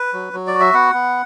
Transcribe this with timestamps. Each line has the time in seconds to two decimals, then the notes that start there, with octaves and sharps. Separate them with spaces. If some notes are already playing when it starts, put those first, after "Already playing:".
Already playing: B4
0.13 F#3
0.33 F#3
0.47 D5
0.54 F#4
0.60 E5
0.73 B3 F#5
0.94 B3